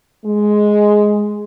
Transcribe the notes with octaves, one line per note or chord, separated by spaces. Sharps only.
G#3